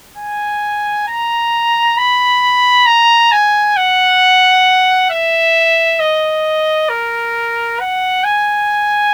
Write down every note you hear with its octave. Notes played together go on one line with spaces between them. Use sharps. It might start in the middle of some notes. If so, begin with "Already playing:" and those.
G#5
A#5
B5
A#5
G#5
F#5
E5
D#5
A#4
F#5
G#5